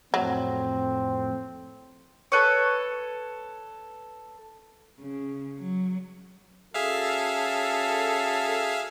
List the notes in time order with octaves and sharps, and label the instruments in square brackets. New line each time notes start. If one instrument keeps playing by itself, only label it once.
[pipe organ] F2 A2 [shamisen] F#3 [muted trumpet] C4
[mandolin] A4 B4 C#5
[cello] C#3
F#3
[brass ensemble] C#4 F#4 A4 [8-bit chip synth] G#4 E5 F5